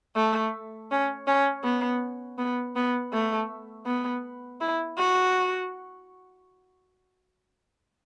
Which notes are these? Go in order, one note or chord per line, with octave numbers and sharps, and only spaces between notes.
A3
C#4
C#4
B3
B3
B3
A3
B3
E4
F#4